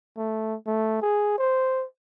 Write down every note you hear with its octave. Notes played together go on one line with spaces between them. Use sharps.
A3
A3
G#4
C5